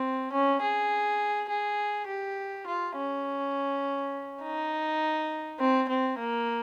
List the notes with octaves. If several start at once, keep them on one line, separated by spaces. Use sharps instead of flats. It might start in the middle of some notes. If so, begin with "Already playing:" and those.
Already playing: C4
C#4
G#4
G#4
G4
F4
C#4
D#4
C4
C4
A#3